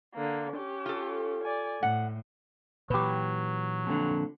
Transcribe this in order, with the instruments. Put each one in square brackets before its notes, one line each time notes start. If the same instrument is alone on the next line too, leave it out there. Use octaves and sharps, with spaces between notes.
[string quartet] D3 A#3
C#4 G4
[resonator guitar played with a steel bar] F4 A4
[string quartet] D5 G#5
[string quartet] A2 [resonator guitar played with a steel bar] F#5
[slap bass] A#2 E3 [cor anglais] F#3 [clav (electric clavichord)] G4 B4
[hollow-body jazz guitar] F2 A#2 D3